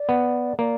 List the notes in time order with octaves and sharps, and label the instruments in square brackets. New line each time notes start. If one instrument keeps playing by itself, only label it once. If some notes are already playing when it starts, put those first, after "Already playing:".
Already playing: [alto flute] D5
[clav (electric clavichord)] B3
[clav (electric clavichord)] A#3 [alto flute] D5